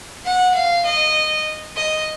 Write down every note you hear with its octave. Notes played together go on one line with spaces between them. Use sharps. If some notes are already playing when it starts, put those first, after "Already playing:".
F#5
F5
D#5
D#5